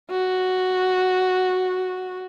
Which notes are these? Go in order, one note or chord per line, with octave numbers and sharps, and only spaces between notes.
F#4